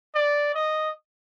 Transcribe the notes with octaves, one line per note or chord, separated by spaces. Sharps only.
D5
D#5